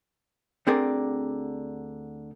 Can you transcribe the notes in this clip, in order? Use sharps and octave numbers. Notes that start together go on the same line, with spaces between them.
D2 D3 C4 G#4 A#4 D5